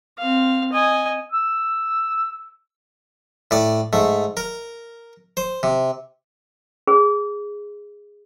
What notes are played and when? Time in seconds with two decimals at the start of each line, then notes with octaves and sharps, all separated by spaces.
0.18 C4 F5
0.72 D#5 G#5
1.32 E6
3.51 A2 D5
3.93 G#2 A3
4.37 A#4
5.37 C5
5.63 C3
6.88 G#4